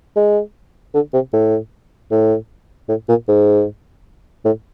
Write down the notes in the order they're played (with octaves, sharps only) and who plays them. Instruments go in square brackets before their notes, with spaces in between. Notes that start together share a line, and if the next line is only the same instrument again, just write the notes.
[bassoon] G#3
D3
C3
A2
A2
A2
A#2
G#2
A2